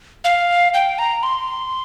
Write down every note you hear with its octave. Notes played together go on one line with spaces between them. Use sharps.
F5
G5
A#5
C6